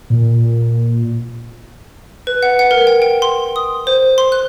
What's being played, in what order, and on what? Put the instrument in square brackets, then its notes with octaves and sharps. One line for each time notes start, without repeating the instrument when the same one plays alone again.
[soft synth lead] A#2
[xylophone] B4
F#5
F#5
A#4
G5
G5
C6
D#6
C5
C6
F#6